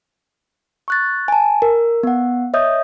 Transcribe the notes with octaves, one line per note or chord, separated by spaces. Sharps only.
C#6 F#6 A6
G#5 A5
A#4
B3 F#5
C#5 D#5 E5 D#6 G6